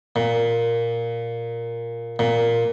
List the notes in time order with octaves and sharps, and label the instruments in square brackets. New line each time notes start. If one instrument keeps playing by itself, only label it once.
[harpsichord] A#2
A#2